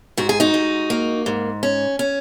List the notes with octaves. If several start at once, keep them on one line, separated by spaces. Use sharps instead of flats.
G#2 F#4
G#4
D#4 F#4
G#2
A#3
G#2
C#4
C#4